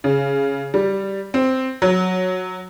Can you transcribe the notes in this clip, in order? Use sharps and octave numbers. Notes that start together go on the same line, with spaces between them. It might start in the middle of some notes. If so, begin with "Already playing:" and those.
C#3
G3
C4
F#3